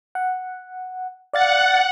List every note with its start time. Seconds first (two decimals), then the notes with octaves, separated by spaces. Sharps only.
0.15 F#5
1.33 D5 F5 F#5 A6